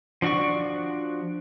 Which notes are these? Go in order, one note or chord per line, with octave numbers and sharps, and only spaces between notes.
F3 D4 F#4 D5 C#6